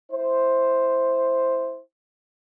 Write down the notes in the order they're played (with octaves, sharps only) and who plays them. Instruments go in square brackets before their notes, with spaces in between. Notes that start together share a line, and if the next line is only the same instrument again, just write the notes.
[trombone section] E4 C5